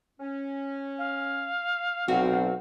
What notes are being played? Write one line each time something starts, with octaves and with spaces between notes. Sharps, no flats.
C#4
F5
B1 C4 F#4